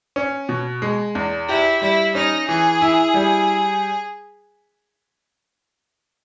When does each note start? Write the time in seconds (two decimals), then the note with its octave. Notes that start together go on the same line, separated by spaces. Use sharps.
0.16 C#4
0.49 B2
0.82 G#3
1.15 E2
1.49 E4 G4
1.81 G3 E4
2.15 C#4 D#4
2.48 E3 G#4
2.81 E4
3.14 G3